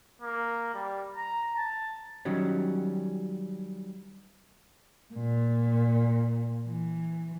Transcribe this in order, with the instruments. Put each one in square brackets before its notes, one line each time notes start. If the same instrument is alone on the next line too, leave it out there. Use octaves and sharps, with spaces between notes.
[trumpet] A#3
G3
A#5
A5
[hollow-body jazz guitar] D#3 F#3 G3 C#4
[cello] A#2
E3